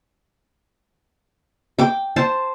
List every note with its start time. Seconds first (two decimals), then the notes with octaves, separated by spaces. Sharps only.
1.79 G5 D6
2.16 C5 A5